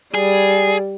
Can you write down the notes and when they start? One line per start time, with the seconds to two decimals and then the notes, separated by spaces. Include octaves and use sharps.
0.14 G3 G#4